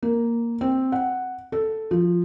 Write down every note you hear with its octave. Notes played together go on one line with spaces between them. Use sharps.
A#3
C4
F#5
A4
F3